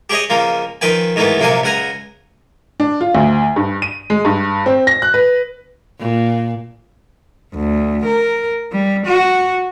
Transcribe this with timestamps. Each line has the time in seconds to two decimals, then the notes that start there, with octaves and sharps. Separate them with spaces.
0.10 G4 G#4 C#5 D#5
0.30 C#2 C#3 F3 A#3
0.81 D#3 F3 B4 G5 G#5
1.16 G#2 D#3 E3 A3 B3
1.40 A#1 C3 F#3 A#3 G#5 A5
1.63 C#2 C#3 F#5 G#5 A#5
2.80 D4
3.01 F4
3.15 D2
3.56 G2
3.82 D#7
4.10 G#3
4.25 G2
4.66 C4
4.87 A#6
5.02 F#6
5.14 B4
6.00 A#2
7.55 D2
8.06 A#4
8.72 G3
9.06 F#4